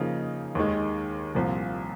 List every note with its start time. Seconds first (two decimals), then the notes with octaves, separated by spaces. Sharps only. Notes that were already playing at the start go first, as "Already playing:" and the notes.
Already playing: C#3 F3 A#3 D#4
0.55 D#2 D#3 G#3
1.35 C2 A#2 F3